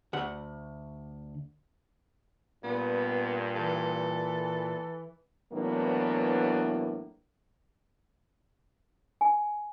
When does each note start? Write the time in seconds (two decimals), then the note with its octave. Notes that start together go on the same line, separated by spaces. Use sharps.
0.13 D2 F#5
2.64 G2 A#2 B3
3.56 E3 A4
5.52 A2 E3 F#3 A#3 B3 D4
9.21 G#5